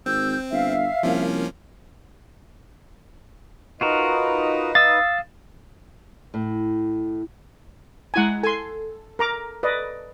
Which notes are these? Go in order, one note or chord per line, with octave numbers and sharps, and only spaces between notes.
G#1 C4 E6 G6
G1 E5 F5
C2 F3 A#3 C#4
D#4 F4 F#4 A#4 B4 D#5
F5 D#6 E6 A6
A2
G#3 E4 F#5 G#5 A#5
A4 G#5 C6
A#4 A#5 D6
B4 D5 D#5